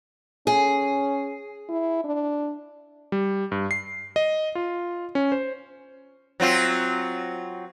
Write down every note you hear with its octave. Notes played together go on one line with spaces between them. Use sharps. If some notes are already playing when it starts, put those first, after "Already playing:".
C#4 G#4
E4
D4
G3
G2
C7
D#5
F4
C#4
C5
F#3 C4 F4